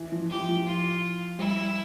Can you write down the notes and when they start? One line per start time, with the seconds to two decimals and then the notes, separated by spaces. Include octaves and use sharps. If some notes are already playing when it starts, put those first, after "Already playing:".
Already playing: E3
0.12 F3
0.29 F3 G4
0.48 F3
0.66 F4
1.39 G3 E4